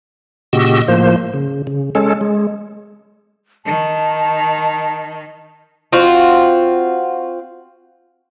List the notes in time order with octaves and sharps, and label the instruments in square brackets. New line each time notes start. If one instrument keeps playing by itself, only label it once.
[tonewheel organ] A#2 C#3 F#4 G4 D#5 E6
A2 F3 A#3 C5
C#3
C#3
G#3 C#4 A4
G#3
[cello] D#3 [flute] A5
[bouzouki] C4 F4 F#4